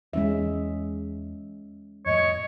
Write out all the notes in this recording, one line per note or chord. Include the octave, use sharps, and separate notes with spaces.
E2 G#3 C#4 E5
F2 A2 C#5 D#5